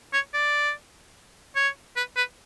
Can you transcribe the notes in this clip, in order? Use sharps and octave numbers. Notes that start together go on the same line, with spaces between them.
C#5
D5
C#5
B4
B4